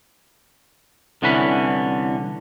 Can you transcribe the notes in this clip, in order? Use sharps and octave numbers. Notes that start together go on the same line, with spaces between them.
C2 D3 E3 C#4 F#5 B5